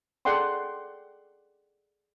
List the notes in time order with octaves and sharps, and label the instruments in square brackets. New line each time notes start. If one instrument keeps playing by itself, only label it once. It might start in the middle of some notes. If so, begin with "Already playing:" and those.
[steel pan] G#4 A4 D5 F#5 G5 C6